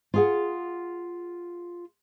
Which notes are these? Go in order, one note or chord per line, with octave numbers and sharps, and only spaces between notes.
F4 G#4 F#5